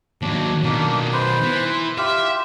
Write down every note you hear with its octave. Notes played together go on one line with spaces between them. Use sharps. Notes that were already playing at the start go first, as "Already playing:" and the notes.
D#2 F#3 D4
B2 D#3 A#3 D4
B4 C5
E3
F4 G4 E5 F5